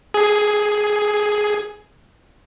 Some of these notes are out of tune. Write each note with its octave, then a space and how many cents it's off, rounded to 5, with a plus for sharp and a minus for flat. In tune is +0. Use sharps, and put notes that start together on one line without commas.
G#4 +10